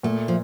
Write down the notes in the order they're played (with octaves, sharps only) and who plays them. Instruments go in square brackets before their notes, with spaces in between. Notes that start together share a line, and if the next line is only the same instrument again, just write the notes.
[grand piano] A#2 [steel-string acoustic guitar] A3
[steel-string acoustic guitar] F3